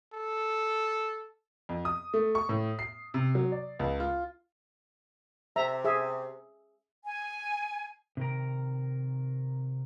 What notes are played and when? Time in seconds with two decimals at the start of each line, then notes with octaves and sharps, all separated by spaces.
0.13 A4
1.69 F2
1.85 D#6
2.14 A3
2.35 C#6
2.49 A2
2.79 C7
3.14 C3
3.35 F#3
3.52 D5
3.79 C#2
4.00 F4
5.56 C3 E5 A#5
5.85 G#4 E5
7.06 G#5
8.17 C3 D#3 A#4